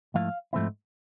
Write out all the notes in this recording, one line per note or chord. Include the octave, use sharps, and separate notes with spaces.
G#2 F3 A3 E4 F5
G#2 F3 A3 C4 E4